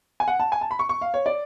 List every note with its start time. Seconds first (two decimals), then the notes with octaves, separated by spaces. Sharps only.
0.20 G#5
0.28 F#5
0.40 A5
0.52 G#5
0.61 A5
0.71 B5
0.79 C#6
0.89 C#6
1.01 F5
1.14 C#5
1.26 D5